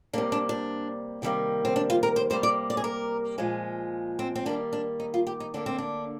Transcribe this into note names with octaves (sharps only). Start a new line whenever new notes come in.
C3 G3 A#3 D4
D4
D4
C3 D#3 G3 A#3
C4
D4
F4
A#4
C5
C3 G3 A#3 C5
D5
D5
G#4
A#4
A#2 F3 G#3
C4
C4
D#3 G3 A#3 D4
D4
D#4
F4
G4
D#4
D3 G3 A#3 D4
C4
D4